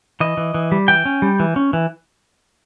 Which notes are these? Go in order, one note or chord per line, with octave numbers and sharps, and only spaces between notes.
E3 D#5
E3
E3
G3
E3 G5
C#4
G3
E3
C#4
E3